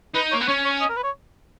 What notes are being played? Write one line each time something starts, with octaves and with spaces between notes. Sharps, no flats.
D#4 B4
A#3 C#5
B3
C#4 C#5
C#5
D#5
A#4
B4
C#5